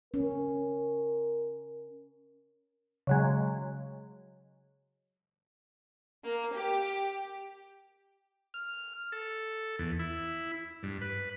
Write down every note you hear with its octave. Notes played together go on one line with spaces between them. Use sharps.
C#4 A#4
C#3 F#3 G#3
A#3
G4
F6
A4
E2
E4
G2
B4